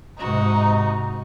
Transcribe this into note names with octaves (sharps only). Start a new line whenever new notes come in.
G#2 C3 D#4 F#4